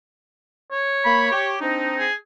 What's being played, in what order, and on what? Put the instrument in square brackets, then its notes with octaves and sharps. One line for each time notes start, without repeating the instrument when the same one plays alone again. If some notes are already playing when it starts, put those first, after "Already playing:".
[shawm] C#5
[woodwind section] A#3 B5
G4
C4 D4 D#4
[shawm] G#4